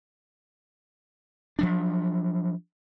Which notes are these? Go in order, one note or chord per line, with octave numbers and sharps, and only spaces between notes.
F3 F#3 D4